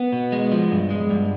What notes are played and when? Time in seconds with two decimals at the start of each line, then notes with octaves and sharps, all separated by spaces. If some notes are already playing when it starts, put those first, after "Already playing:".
Already playing: B3
0.13 B2
0.32 G#3
0.52 F3
0.72 G2
0.90 G#3
1.10 G2